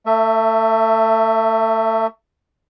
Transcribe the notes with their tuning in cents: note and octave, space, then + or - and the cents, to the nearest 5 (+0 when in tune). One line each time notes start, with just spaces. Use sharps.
A3 +30 E5 +0